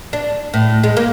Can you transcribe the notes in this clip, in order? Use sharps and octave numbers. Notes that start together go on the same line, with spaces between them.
D4
A2
G#3
A#3